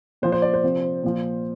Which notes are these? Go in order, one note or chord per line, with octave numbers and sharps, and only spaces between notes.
A#2 F3 C5
C5
D5
C5
C3 F3
A#2 F3